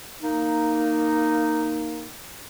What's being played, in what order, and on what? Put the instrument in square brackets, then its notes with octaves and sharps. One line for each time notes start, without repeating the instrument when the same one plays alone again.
[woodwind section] A#3 D#4